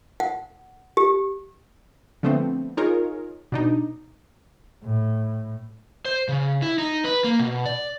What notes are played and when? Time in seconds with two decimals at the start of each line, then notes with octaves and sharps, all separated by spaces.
0.20 F#5
0.97 G4
2.23 D3 F3 A3 B3 C4
2.77 D#4 F4 G#4 A#4 C#5
3.52 B2 D4 D#4
4.83 A2
6.05 C5
6.28 C#3
6.62 E4
6.78 D#4
7.04 B4
7.24 A#3
7.39 B2
7.65 D5